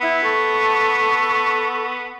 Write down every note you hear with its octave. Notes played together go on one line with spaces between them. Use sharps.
B3 E4 E6
A4 C#6